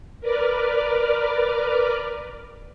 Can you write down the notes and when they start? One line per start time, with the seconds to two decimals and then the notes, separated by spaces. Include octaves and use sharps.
0.21 A#4 B4 D5 D6 F6